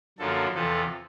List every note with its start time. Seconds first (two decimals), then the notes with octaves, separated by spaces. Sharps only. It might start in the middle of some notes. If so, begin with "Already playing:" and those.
0.18 F#2 D3 F3 A#3 A4
0.54 E2 C3 F3 A4